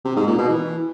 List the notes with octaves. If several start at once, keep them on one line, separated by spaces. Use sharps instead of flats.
C3
G#2
A#2
B2
E3